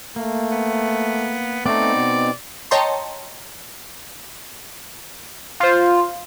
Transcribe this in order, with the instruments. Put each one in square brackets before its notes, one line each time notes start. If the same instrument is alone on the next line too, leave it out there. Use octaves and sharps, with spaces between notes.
[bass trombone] A3 [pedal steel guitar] A#3
[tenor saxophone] B3
[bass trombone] A3 [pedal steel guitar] B3 C4 D#4 [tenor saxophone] D5
[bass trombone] B2
[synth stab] C#5 D#5 G5 A5 A#5 C6
[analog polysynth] F4 C5